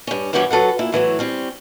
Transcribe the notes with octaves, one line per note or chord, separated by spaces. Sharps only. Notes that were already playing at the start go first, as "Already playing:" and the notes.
G2 C#4
G2 E3 C#4 F#4 G4 B4
F#3 A4 B4 F#5
A#2 E4
A2 E3 F#3 A3
G3 C4 C#4